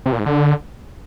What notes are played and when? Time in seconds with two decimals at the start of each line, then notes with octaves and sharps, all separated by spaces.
0.06 C3
0.12 A#2
0.19 G#2
0.26 D3